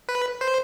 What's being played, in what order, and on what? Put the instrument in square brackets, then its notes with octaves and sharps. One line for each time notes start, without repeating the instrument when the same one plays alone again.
[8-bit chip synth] B4
C5